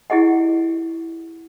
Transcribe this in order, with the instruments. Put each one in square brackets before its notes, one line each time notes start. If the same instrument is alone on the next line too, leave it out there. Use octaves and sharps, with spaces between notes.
[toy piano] E4 G4 G#4 D#5 F#5